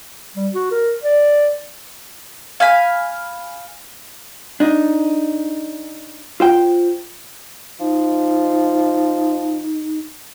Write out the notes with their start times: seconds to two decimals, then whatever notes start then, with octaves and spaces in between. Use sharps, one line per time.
0.36 G3
0.54 F#4
0.71 A#4
1.04 D5
2.60 F5 G#5 B5
4.60 D4 D#4
6.40 F4 C5 G5
7.80 F3 D#4